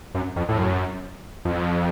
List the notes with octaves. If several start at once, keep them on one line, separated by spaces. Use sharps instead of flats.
F#2
F2
A2
F#2
F2